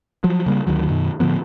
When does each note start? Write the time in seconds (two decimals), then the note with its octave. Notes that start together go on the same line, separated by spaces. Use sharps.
0.24 F3 F#3
0.46 C#3 G3 A#3
0.67 D2 D#3 F#3
0.88 F#2 B2 D#3
1.20 A2 D3 F3 B3